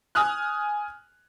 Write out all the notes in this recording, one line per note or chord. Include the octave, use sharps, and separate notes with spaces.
G#5 D#6 F6 F#6